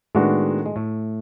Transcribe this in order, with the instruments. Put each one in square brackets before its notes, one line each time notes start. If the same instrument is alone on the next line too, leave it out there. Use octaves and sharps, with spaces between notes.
[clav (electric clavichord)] A2 A3 [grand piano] D#3 G#3 B3 D4 F#4
[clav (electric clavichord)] G#3
A2 A3